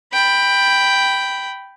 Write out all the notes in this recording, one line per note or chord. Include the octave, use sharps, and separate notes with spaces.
G5 B5